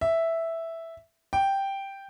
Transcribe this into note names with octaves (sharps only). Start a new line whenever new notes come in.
E5
G5